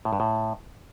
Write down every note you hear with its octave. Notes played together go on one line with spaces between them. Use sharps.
A2
G2
A2